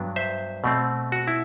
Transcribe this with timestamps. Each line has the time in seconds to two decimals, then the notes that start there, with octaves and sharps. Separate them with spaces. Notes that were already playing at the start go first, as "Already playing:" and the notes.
Already playing: G2 F#3 B3 D4
0.16 C5 E5
0.64 B2 A3 C4
1.12 F#4
1.28 E4